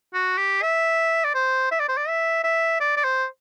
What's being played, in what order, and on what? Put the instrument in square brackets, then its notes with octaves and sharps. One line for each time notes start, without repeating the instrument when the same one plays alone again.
[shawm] F#4
G4
E5
D5
C5
E5
D5
C5
D5
E5
E5
D5
D5
C5